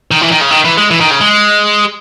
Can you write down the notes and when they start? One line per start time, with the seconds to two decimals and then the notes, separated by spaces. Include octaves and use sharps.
0.11 D#3
0.21 E3
0.31 D#3
0.41 C#3
0.51 D#3
0.64 E3
0.78 G#3
0.91 E3
1.01 D#3
1.11 C#3
1.21 G#3